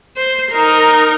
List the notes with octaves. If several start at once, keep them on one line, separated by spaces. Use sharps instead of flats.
C5
D#4 A#4